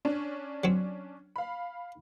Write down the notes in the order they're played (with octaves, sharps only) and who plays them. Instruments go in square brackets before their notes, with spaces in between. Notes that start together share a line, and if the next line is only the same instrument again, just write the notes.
[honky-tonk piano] C#4 D4
[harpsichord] F#3 C4
[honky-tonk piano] F5 B5